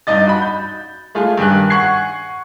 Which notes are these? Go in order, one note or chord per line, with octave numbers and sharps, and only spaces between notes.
G2 D#4 D#5 A6
F#4 B5
G6
G#3 A3 F4 G#4
G2 D#3 G4 G#5 F#6
F#5 G#5 C#6 F#6 G#6 C7